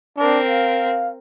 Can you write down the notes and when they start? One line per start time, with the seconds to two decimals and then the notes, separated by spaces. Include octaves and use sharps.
0.17 C4 D4 A#4
0.49 F5